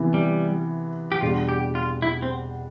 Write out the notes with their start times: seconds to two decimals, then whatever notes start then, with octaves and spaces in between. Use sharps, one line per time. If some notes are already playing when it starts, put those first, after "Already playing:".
Already playing: C3 E3 B3 E4
0.14 G3
1.12 G4
1.21 E2 B2 G3 D4 F4
1.49 G4
1.75 F4
2.02 E4
2.22 C4